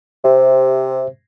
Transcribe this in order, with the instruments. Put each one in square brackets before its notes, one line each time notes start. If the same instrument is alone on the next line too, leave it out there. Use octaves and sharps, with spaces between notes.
[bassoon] C3 [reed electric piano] G4 C5 E5